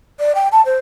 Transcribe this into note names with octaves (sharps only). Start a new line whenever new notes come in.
D5
G5
A5
C5